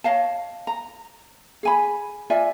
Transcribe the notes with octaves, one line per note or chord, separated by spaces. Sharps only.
C#5 D#5 F5 A5
A#5
G#4 G#5 B5
F4 D5 E5 G#5